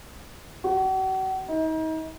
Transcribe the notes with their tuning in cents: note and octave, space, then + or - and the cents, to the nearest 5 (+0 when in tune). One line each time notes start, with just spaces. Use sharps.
F#4 +40
D#4 +35